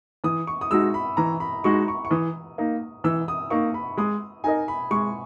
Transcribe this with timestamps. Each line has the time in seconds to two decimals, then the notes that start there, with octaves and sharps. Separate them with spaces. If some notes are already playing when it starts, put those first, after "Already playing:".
0.24 E3 D#6
0.47 C#6
0.61 D#6
0.71 G#3 D#4 F#4 E6
0.94 B5
1.17 E3 A#5
1.40 B5
1.64 G#3 D#4 F#4 C#6
1.88 C#6
2.05 C#6
2.11 E3 D#6
2.58 A#3 D#4
3.04 E3 E6
3.28 D#6
3.50 A#3 D#4 C#6
3.74 B5
3.97 G#3 D#6
4.44 D#4 A#4 D#5 G#5
4.68 B5
4.91 G#3 C#6